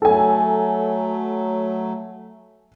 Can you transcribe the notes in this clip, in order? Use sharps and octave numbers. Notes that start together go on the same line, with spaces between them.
F#3 A3 A4 G#5